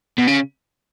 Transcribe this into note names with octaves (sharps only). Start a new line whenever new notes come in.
B2
C#3